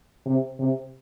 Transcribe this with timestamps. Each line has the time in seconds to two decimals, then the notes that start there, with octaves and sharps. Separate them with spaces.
0.26 C3
0.59 C3